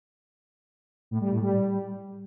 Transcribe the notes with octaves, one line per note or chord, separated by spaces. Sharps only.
A2
G3
A2
G3